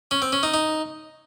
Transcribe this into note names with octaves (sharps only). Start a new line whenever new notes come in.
C#4
C4
C#4
D#4
D#4